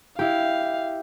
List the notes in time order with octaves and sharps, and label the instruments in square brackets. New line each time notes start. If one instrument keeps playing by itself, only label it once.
[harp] E4 G4 [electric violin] F5